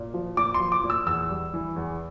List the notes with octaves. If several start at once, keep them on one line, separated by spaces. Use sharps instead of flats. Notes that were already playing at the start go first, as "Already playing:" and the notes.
Already playing: A#2
F3
A#2 D6
C6
F3
D6
A#2
E6
E2 E6
G3
E3
E2